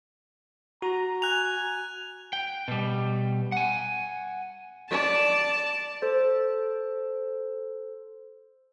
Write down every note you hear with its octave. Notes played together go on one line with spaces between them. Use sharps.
F#4 A#5
G#5 F#6 F7
G5
B2 G3
F#5 G#5
D5 A5
A4 C5